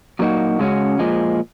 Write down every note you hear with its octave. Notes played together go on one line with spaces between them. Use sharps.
A#2 F#3 A#3 D#4 F#4
C#3 G#3 C#4 F#4
A#2 F3 G#3